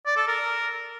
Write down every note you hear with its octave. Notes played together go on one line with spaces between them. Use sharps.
D5
A4
A#4